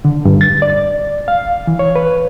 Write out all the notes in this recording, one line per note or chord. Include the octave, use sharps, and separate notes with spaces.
D3
G2
A6
D5
F5
E3
C#5
B4